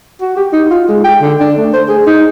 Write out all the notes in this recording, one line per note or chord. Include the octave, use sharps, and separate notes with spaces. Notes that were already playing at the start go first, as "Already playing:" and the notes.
F#4
G4
D#4
F4
G#3
G5
D3
D4
A3
C5
G#4
D#4